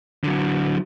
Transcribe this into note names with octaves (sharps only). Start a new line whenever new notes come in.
D3 F#3